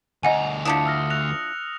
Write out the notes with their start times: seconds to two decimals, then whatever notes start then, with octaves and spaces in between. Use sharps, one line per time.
0.23 D2 D#5 F#5 G#5 A#5
0.65 F3 D4 E4 D#6 C#7
0.86 E6 F6 A#6
1.10 F#6 A#6 F7